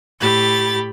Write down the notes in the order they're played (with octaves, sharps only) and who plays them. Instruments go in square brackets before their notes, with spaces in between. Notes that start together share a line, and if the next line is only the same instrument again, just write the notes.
[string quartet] A2 G4 B5 A6